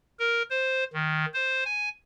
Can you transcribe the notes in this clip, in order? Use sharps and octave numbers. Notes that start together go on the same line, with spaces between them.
A#4
C5
D#3
C5
G#5